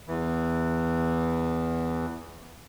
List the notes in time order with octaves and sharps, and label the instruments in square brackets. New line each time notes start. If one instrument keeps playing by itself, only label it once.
[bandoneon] E2 E3